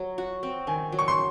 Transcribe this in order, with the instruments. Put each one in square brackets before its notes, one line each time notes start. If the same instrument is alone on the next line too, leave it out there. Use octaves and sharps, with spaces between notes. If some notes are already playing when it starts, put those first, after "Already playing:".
Already playing: [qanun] F#3
F#4
C4
[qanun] D#3 [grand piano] G#5
[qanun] F#3
[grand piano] C#6
C6